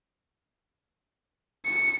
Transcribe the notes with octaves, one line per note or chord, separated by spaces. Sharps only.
C#7